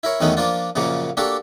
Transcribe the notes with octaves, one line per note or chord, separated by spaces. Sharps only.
E4 A#4 C#5
E2 D#3 F#3 A3 B3 C#4
F3 A#3 D4 F4
F#2 A#2 C#3 F3 A#3
A#3 D4 F#4 G4 A4